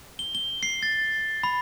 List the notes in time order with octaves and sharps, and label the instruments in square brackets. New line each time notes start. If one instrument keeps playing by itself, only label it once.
[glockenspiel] G7
G7
C7
A6
B5